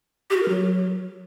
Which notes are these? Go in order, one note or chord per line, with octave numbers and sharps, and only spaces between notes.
G4
F#4
A#4
F#3